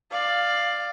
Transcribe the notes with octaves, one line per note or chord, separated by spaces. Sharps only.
D5 F5